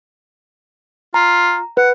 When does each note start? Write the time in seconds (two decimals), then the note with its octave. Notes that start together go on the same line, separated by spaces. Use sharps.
1.14 F4 A#5
1.77 B4 F#5